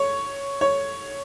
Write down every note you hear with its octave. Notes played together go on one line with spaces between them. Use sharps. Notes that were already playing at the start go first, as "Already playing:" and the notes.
Already playing: C#5
C#5